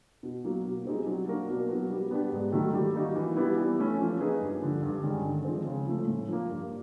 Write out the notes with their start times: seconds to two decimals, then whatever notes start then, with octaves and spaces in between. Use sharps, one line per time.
0.23 B2
0.44 F#3 A#3
0.65 B2
0.85 G3 C4 D#4 G#4
1.07 F#3
1.27 A#3 D4 F#4 A#4
1.48 B2
1.69 F#3 B3
1.90 G3
2.11 B3 D4 G4
2.32 G#2
2.52 D#3 F#3 A3
2.73 G3
2.94 A#3 D#4 F#4
3.16 E3
3.37 G3 B3 E4
3.58 E3
3.79 A3 C#4
3.99 F3
4.20 A#3 D#4 G#4 B4
4.40 G2
4.62 D3 F3
4.83 G2
5.03 D#3 G#3 C#4
5.24 D3
5.45 F3 G#3 C4
5.67 C#3
5.87 F3 A3
6.07 A2
6.28 F3 A#3
6.49 G2